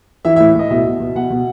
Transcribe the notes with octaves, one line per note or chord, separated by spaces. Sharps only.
E3 E5
A2 E5
A2 D#5
B2 E5
B2
B2
B2 F#5
B2